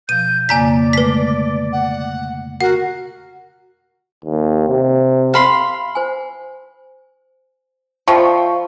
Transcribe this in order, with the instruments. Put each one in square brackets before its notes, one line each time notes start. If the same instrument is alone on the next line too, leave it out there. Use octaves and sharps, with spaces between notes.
[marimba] B2 F3 [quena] G6 [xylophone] D#7
[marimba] F2 C#3 A#3 [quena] D5 [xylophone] G#5 A#5 B6
[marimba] D3 G#3 A3 [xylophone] B4 B6
[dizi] F#5
[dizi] F#4 [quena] A#4 [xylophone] F#5
[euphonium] D#2
C3
[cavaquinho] F5 B5 C6
[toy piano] C5 G#5
[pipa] F3 [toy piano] D5 A5 B5 [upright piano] E5 G5 C#6